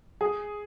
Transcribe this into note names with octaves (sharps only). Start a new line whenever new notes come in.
G#4